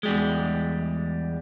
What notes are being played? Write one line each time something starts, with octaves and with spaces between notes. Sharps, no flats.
E2 G3 G#3